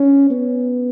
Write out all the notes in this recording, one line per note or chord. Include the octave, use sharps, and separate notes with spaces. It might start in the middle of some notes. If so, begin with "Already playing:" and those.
Already playing: C#4
B3